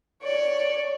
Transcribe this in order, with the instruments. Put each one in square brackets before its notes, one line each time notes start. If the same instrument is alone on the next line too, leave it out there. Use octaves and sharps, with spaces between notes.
[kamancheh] C#5 [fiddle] D5